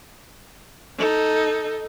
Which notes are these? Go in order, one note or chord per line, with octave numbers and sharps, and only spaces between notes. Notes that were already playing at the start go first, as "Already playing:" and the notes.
D#4 A4